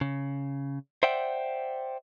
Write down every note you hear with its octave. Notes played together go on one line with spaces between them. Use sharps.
C#3
C5 D5 E5 F#5 G5